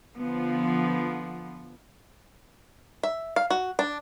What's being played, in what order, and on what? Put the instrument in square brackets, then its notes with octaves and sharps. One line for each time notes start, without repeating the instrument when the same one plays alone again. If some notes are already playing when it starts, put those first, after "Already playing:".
[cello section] D3 F3 B3
[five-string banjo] E5
F5
F#4
D4